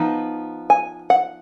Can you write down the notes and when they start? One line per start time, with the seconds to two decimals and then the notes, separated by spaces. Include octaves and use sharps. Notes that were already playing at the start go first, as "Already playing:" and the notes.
Already playing: F3 B3 D#4
0.70 G#5
1.10 F#5